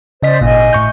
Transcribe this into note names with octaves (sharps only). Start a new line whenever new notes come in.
C#3 C5 D5 D#5 B6
G#1 A#2 D#5 G#5
A2 C#6 G6